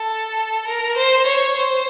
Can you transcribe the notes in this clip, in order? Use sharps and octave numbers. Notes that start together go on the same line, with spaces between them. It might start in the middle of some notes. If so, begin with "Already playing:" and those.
Already playing: A4
A#4
C5
C#5
C5